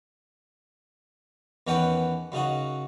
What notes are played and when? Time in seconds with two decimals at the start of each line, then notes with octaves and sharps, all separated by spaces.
1.67 E2 D#3 C#4 B4 F#5 G5
2.32 F#2 C#3 D#4 F#4